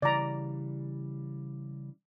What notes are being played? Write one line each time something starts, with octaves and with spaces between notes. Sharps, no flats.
C#3 E3 G3 D5 A#5